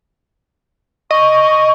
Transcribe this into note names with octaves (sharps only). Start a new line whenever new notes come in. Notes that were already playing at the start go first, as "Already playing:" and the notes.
D#5 C#6